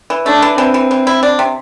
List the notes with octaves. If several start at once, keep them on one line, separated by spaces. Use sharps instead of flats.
E3
A3 D4
E3
E3 C4
E3
E3
E4
D4
C3